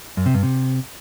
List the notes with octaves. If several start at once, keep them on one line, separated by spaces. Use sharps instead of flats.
F#2
C3
G2
C3